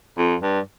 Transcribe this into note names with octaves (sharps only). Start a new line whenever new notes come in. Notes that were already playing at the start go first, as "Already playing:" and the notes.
F2
G2